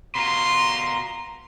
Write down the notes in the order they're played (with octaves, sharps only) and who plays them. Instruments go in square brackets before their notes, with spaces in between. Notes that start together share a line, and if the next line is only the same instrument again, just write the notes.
[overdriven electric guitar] B2 F4 [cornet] A#5 [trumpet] C6